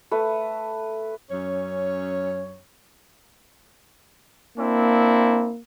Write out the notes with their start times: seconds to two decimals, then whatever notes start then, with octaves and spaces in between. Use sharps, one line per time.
0.11 A3 B4
1.31 F#2 C#4 C#5
4.57 A#3 C4 D4 E4